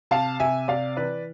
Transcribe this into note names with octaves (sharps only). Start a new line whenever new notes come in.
C3 F5 A5
C3 E5 G#5
C3 D5 F5
E3 B4 D5